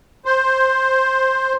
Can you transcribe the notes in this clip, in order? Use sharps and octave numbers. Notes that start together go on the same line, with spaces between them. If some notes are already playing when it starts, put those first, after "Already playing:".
C5